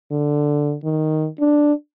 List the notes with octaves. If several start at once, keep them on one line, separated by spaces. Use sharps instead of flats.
D3
D#3
D4